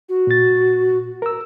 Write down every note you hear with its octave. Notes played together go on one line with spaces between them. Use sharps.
F#4
A#2 A6
A#4 E6